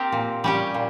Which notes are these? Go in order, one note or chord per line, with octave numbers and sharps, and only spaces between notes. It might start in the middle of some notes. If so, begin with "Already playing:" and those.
Already playing: C4 G4 A#4
A#2
G3 C#4 G4
A#2